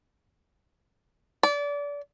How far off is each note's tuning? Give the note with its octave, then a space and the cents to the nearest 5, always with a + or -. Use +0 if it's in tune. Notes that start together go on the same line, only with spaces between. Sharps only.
D5 -30